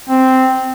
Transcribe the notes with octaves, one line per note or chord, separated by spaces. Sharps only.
C4